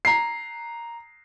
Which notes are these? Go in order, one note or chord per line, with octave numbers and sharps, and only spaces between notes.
A#5 C7